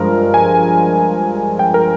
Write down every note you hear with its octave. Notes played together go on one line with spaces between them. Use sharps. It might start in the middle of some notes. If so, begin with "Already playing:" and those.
Already playing: G2 F3 G#3 A#4
G#5
G5
A#4